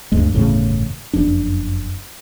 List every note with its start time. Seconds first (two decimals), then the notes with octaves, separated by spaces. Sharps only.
0.12 D2 G2 G#3
0.32 G1 E2 A2 C#3
1.13 F#1 F2 D4